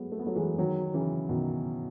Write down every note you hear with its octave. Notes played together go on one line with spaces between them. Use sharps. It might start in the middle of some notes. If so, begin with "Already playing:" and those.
Already playing: F#3 G#3 A3 B3
A3
B3
F#3 A3
E3 G#3
D#3 F#3
C#3 E3
B2 D#3